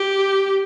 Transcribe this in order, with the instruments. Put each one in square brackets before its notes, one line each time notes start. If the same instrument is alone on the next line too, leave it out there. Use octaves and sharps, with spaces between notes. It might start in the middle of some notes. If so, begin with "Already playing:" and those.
Already playing: [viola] G4